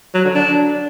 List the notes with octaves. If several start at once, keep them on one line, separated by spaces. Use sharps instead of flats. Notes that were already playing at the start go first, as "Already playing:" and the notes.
F#3
D3
D4